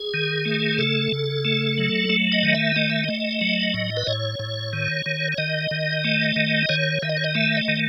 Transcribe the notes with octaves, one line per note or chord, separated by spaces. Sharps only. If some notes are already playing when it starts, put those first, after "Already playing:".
Already playing: G#4
D#3
A3
C#3 A4
C#3
A3
F#3
A3
D#5
D#3
E5
A3 D#5
E5
A3 D#5
F#3
A2
B4
A2 C#5
A2
D#3
D#3
C#5
D#3 D#5
D#3
A3
D#3
D#3 C#5
D#3 E5
D#5
C#5
D#5
A3 E5
D#5
D#3